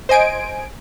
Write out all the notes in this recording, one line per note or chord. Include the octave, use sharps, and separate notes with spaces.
C5 D#5 G#5 D7